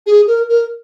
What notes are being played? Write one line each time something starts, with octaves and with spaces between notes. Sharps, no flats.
G#4
A#4
A#4